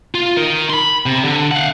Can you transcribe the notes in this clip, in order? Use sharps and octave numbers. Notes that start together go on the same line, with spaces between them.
F4
D#4 A#4
B5 C6
C3
D3
F5 F#5